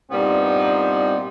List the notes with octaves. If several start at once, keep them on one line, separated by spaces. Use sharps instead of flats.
G2 A#2 G3 B3 C4 D#4